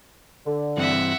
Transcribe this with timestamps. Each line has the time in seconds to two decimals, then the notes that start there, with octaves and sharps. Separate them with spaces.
0.46 D3
0.77 G2 E3 C4 E5 F#5